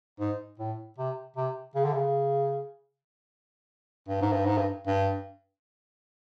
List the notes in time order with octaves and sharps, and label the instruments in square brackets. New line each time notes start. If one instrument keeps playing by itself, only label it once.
[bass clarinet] G#2
A2
C3
C3
C#3
D3
C#3
G2
G#2
G2
G#2
G2
G2